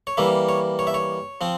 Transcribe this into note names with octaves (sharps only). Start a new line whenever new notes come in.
C#5
E3 G3 A#3 E5
C#5
C#5
E5
C#5
F3 C4